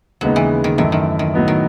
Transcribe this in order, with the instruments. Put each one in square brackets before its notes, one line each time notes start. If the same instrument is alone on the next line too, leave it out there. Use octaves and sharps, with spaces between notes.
[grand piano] D#2 C#3 G#3 B3 D#4 [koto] F#3
[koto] E3
D#3
[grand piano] F#2 E3 A3 E4 [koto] D#3
[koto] D#3
D#3
[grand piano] A2 F#3 B3 D#4
[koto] D#3